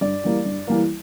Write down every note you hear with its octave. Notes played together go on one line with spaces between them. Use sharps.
G2 D5
E3 G3 A#3
G2
E3 G3 A#3